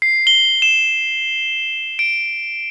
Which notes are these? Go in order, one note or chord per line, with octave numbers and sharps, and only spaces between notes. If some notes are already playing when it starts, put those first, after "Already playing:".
C7
G7
E7
D7